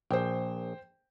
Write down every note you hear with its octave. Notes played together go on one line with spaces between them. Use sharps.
A#1 C5 G5